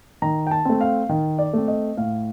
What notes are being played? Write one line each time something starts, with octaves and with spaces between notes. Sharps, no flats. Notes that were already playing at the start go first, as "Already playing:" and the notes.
D#3 A#5
G5
A5
A3 C4
F5
D#3
D5
A3 C4
D#5
A2 F5